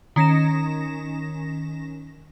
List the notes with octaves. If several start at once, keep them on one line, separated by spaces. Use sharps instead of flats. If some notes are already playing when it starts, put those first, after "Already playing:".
D#3 C#4 A#6 E7